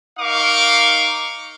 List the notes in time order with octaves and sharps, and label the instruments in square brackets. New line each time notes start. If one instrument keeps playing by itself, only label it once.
[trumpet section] D#4 A#4 F5 C#6 D6